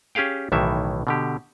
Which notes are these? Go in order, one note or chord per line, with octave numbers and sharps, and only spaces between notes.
C#4 G4 G#4 F5 G5
B1 A2 D#3 E3 E5
B2 D3 G4